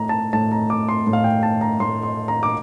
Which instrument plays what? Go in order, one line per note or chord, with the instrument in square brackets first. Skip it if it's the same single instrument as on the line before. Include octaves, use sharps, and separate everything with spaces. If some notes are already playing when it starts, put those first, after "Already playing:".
Already playing: [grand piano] A2 A#5
A5
A2 A5
A#5
D6
C6
A2
F5
G5
A5
A#5
A2 C6
C6
A#5
D6